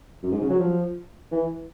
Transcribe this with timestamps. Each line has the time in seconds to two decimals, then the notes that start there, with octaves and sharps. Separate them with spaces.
0.23 F#2
0.32 G#2
0.41 C#3
0.50 F#3
0.59 F3
1.32 E3